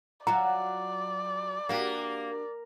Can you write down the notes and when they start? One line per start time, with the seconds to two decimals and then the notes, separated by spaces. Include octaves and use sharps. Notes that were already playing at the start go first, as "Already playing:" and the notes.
0.27 F#3 F4 F#4 D5 A#5
1.69 A#3 D4 F#4 G4